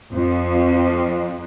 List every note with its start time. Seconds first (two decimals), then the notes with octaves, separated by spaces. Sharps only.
0.13 F2